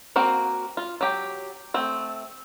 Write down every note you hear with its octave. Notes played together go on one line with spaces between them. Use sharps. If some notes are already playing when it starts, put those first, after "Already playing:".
A#3 C4 F#4 F5
F4
F#3 G4
A3 C4